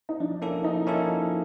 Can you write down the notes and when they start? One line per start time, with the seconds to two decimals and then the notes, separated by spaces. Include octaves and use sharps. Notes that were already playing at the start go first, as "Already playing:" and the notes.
0.09 D#4
0.20 F3 D4
0.42 A#3 C#4 E4 A4
0.63 F3 D#4
0.87 A#3 C#4 E4 A4
1.08 F3